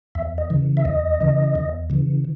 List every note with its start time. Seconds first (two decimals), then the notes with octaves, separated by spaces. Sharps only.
0.15 E2 E5
0.38 D#5
0.50 C#3 E3
0.77 E5
0.85 E2 D#5
1.20 C#3 E3
1.55 E2
1.90 C#3 E3